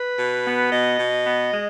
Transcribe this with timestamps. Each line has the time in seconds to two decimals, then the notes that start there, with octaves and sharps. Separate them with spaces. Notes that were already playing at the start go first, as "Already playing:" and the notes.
Already playing: B4
0.19 B2
0.45 B3
0.72 B2 D#5
0.99 B2
1.25 B3
1.51 G#3